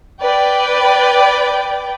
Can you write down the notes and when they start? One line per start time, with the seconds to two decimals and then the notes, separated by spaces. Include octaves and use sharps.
0.21 B4 D5 G5